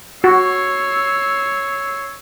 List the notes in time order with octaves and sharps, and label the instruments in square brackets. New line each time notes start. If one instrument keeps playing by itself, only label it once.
[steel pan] F#4 [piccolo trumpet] C#5 [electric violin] E6 C7